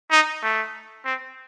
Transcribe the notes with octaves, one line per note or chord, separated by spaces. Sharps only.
D#4
A3
C4